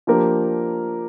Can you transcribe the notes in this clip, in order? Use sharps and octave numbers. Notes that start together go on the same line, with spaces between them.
F3 A#3 D4 G4 A#4